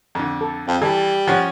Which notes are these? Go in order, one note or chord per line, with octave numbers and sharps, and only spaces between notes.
F2 D3
A4
F2
E3 G3 A4
F3 C#4 F#5